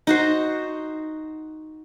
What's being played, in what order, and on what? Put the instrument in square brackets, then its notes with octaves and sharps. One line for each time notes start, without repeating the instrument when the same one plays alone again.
[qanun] D#4 F#4 C5